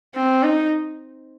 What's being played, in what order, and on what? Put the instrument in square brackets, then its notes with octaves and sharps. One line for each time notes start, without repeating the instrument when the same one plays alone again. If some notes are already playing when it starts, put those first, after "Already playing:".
[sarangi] C4
D#4